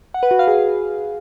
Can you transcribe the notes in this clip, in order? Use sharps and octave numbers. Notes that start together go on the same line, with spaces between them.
F#5
B4
F#4
F5
G#4